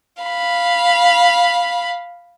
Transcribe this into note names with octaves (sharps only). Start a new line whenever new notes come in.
F5 B5